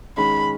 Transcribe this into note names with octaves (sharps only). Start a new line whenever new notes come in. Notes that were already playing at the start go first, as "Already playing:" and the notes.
D#3 G#3 C#4 B5